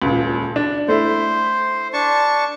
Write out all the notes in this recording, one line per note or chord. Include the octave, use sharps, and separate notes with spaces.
D#1 C#2
D4
A3 E4 C5
D4 A5 C#6